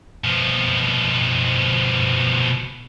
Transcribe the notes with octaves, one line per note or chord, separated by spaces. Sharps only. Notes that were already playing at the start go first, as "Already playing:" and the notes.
B2 F3